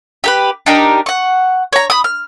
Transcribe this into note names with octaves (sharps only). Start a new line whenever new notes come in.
G4 A#4 B4
D4 D#4 G4 A#4
F#5 C#6
C#5 A#5
B5 D#6
F6